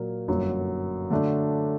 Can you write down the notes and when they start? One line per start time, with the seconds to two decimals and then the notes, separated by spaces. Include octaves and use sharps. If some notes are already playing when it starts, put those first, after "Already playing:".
Already playing: A#2 F#3 A#3 F#4
0.28 G1 F#2 F#3 A#3
1.10 D3 A3 D4 F#4